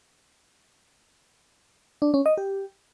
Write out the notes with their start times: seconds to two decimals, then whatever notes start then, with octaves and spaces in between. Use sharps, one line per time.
2.02 D4
2.14 C#4
2.26 D#5
2.37 G4